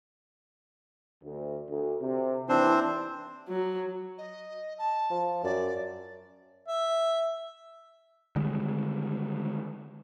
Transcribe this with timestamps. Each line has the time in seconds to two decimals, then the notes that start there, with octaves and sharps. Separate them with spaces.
1.22 D2
1.68 D2
2.02 C3
2.49 D#2 E3 C4 D4 C5
3.48 F#3
4.18 D#5
4.78 A5
5.10 F3
5.44 F#2 D5
6.68 E5
8.36 D3 D#3 G3 G#3